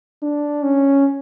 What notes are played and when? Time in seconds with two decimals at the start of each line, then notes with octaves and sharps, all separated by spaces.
0.22 D4
0.63 C#4